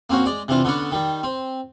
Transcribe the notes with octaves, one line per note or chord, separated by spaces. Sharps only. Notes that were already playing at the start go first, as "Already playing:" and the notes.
A#3 C4 C#4 F#4
G#3 D5
C3 E3 D4 F4
D3 B3 C#4 D4
D#3 G3
C4